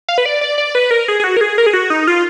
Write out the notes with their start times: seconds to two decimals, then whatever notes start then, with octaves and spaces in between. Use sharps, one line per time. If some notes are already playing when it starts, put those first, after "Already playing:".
0.09 F5
0.18 B4
0.26 D5
0.41 D5
0.58 D5
0.75 B4
0.91 A#4
1.08 G#4
1.20 G#4
1.24 F#4
1.37 A#4
1.41 G#4
1.58 A#4
1.66 G#4
1.73 F#4
1.90 D#4
2.07 F4